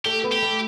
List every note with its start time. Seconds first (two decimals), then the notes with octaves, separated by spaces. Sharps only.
0.05 A3 G4
0.24 B3
0.32 G4
0.42 A3